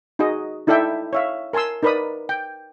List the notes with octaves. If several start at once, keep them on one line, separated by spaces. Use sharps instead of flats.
D#4 F#4 G#4 D#5
D#4 E4 A4 D5 E5 G5
C#5 E5 F5
A#4 G#5 A5 C6 E6
D#4 A#4 B4 D5 B5 D#6
G5